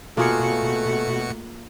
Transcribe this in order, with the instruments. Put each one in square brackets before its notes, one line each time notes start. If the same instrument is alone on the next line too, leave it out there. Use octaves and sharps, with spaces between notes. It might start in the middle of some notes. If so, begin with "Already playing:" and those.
[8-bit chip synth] B2 F#4 C#7 [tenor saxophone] A3 [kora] A#3 F4 G#4